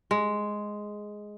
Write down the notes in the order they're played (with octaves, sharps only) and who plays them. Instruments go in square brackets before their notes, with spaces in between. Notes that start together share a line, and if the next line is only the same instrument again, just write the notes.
[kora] G#3